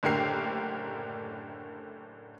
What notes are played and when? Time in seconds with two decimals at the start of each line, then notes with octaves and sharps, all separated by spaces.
0.03 F#1 A2 D3 G4 A#4 C7